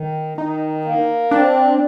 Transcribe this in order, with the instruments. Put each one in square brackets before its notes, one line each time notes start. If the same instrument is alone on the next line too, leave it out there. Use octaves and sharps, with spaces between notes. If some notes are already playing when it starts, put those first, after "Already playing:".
Already playing: [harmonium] D#3
[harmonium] D#3 [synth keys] D#4
[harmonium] A#3
[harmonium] C4 [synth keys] D4